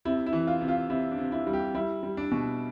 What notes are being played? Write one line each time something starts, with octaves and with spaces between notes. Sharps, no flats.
C3 E4
E4
E3
F4
C3
F4
C3 E4
D4
C3
E4
G3
G4
G3 E4
G3
D4
B2